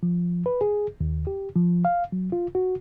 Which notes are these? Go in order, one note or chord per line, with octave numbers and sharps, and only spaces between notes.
F3
B4
G#4
D#2
G4
F3
F5
F#3
F4
F#4